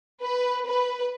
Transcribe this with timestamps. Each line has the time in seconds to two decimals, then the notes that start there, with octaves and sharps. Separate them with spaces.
0.22 B4
0.67 B4